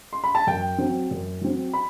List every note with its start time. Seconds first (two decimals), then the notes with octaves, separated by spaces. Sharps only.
0.13 C6
0.24 B5
0.35 A5
0.47 F#2 G5
0.78 F#3 C4
1.11 F#2
1.41 F#3 C4
1.73 B5